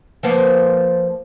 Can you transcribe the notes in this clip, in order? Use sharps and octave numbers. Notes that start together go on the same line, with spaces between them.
F3 A#3 B3